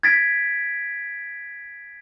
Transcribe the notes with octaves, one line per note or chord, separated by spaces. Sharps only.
G#6 A6 B6 D7